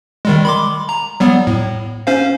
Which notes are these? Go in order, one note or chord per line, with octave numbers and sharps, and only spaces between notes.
D#3 G3 G#3
B5 C6 D6
A#5
F#3 G3 B3
A2
C#4 C5 F5